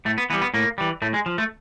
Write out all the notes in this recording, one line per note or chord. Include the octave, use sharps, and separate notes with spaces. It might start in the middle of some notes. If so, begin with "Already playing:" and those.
A2 A3
B3
E3 G3 B3
B3
A2 A#3
E3 G3
A2 A3
G#3
F3
A3